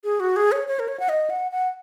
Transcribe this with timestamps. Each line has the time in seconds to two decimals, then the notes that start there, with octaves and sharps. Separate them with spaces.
0.04 G#4
0.20 F#4
0.36 G#4
0.52 C#5
0.68 C#5
0.79 A#4
0.88 C#5
1.00 F#5
1.09 D#5
1.30 F#5
1.52 F#5